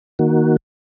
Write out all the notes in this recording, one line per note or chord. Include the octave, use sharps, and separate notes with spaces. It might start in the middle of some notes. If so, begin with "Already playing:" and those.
D#3 A#3 F#4